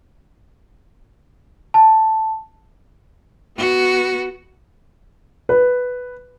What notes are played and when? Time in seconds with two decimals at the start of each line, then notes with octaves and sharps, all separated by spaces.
1.74 A5
3.57 B3 F#4
5.49 B4